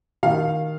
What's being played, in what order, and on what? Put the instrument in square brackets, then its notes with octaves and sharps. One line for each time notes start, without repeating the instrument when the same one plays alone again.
[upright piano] D#3 F5